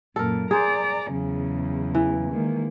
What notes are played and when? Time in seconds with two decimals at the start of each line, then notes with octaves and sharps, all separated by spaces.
0.16 F#2 A#2 A4 A#4
0.51 G#4 C5 D5 A#5
1.11 E2 C#3 F#3
1.95 E3
2.31 D#3 G#3 A#3